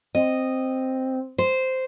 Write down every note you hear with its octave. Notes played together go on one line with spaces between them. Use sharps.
C4 D#5
C5